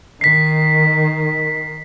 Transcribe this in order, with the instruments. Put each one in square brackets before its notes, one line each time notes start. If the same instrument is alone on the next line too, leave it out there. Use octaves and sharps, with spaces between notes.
[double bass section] D#3 [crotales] B6 C7